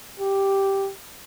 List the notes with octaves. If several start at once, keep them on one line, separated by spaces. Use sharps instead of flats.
G4